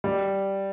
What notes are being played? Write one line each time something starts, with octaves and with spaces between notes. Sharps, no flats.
G3